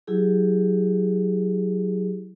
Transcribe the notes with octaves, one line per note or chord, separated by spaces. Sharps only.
F#3 E4 G4 G#4